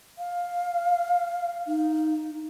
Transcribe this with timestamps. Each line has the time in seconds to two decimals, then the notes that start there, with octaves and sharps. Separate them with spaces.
0.18 F5
1.67 D#4